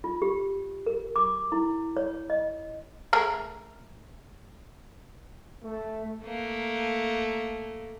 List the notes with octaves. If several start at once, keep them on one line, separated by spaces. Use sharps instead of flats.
F4
G4
A#4
D6
E4
C#5
D#5
A3 G#4 A#4
A3
A3 A#3